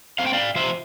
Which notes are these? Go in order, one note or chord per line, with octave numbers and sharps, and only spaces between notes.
A3 C4 F5
G5
D5 F5
F3 C5 E5